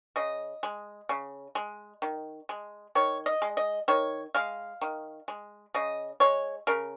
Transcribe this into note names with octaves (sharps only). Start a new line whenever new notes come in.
C#3 D#5
G#3
C#3
G#3
D#3
G#3
D#3 C#5
D#5
G#3
D#5
D#3 C#5
G#3 F5
D#3
G#3
C#3 D#5
G#3 C#5
C#3 A#4